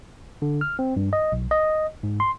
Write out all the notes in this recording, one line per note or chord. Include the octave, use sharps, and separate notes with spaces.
D3
F6
C4
G2
D#5
B1
D#5
G#2
C6